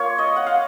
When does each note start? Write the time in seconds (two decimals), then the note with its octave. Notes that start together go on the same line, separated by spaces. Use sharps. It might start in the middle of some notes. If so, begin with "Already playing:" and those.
Already playing: A#3 F4 C#5
0.18 D#5
0.36 F#5
0.47 F5